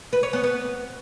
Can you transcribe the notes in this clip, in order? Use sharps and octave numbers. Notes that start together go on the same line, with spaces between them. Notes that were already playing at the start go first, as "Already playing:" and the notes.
B4
C#5
B3
B3